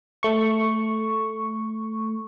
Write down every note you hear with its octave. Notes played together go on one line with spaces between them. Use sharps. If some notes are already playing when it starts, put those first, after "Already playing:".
A3 C#6